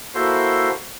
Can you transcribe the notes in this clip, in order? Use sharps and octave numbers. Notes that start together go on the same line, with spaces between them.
A#3 E4 F#4 A4 C5 C6